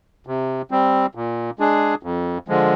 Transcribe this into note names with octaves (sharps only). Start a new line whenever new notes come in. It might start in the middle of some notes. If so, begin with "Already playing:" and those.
C3
G3 C4
A#2
G#3 D4 G#4
F2
D3 F3 G#3